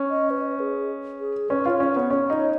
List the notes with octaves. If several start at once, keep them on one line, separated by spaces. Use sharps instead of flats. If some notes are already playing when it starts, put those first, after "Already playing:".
Already playing: C#4
D#5
B4
G#4
G#4
C#4 B4
F4
C#5
C#4
C#5
B3
C#4
D#4